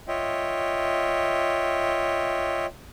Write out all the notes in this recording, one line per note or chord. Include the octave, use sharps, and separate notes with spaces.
F4 C#5 D#5 E5 G5